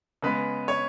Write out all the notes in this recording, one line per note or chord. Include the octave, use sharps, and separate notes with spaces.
C#3 G#3 B3 B4
C#5